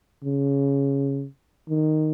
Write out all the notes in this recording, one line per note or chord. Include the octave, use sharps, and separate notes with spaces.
C#3
D#3